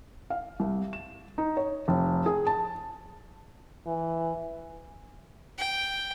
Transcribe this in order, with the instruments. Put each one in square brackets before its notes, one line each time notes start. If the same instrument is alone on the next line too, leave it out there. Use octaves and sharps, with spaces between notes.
[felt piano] F5
C2
E7
D#4
C#5
F1
G#4
A5
[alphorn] E3
[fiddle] G5